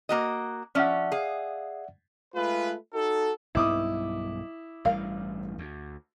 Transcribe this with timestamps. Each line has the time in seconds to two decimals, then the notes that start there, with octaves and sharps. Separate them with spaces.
0.09 A#3 F#4 D#5
0.75 F3 C#4 D5 E5 F#5
1.12 G#4 F5
2.34 G#3 A3 F4 B4
2.93 D#4 F#4 A4
3.55 B1 G2 B3 D#4 E4 D6 D#6
4.85 A1 G2 G3 A#4 F5
5.58 D2